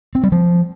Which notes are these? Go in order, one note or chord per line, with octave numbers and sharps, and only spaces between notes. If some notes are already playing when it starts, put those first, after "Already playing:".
C4
G3
F3